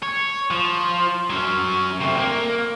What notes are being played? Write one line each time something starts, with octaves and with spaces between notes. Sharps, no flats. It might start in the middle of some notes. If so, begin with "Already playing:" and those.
C#5
F3
F#3 C#4
D2 C3
A#3